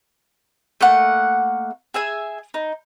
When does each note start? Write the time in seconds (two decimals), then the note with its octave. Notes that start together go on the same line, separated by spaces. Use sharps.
0.81 A3 A#3 F#5
1.94 G#4 E5 G#5
2.54 D#4